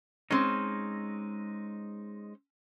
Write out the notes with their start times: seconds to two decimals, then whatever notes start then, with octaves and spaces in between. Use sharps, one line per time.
0.31 G#3 C4 C#4 D#4